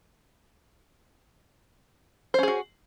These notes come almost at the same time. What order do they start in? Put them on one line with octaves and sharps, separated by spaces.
C5 C#4 G#4 F#4